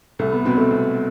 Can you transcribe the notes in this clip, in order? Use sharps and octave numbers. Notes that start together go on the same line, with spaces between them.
C2 A3
B3
B2 F#3 B3 C4
A3
C2